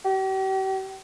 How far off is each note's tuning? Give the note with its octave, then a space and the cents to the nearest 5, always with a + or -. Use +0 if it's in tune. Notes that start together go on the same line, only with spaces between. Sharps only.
G4 -40